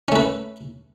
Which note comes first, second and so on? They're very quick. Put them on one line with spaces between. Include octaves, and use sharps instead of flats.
C#4 A3 B4